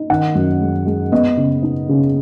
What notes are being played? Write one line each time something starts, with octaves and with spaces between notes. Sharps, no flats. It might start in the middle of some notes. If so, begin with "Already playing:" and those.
Already playing: D#4
D#3 F#5
F#2
G#3
G#3
B3 D#5
C#3
D#4
C#3